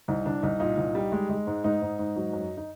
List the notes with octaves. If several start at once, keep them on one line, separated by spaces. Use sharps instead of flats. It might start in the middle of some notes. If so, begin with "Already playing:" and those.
C2 D#4
C2 D4
C2 D#4
A#2 D#4
C2
G3
G#3
G#3
G#2
G#2 D#4
G#2
G#2
F#3
F#2
D#4